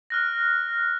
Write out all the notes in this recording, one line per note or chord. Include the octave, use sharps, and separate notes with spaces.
F6 F#6 A#6